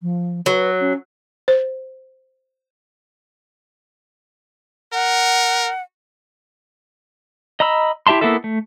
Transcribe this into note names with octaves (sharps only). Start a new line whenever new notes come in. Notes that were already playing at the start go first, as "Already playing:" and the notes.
F3
F#3 B4
C#4
C5
A#4 F#5
D#5 A#5 B5 E6
E4 G4 E5 A5 C6
A#3 B3 E4 A4 E5
A3